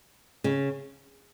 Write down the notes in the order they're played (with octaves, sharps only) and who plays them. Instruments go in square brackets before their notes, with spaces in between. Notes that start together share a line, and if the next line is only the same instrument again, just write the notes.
[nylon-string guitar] C#3